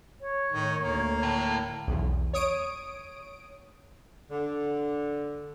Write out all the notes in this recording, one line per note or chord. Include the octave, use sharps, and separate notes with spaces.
C#5
A2 D#3
D2 A#3
A2
B1 E2
C#5 D#6 D7
D3